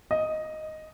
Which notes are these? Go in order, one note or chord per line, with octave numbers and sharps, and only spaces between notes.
D#5